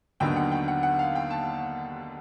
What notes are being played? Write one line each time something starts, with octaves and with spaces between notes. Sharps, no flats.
D#2 D3 F#3 B3 D#4 G5
F#5
G5
F#5
F#5
F5
G5
A5